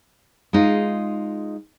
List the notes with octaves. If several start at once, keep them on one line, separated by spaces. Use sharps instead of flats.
G#3 D#4 F4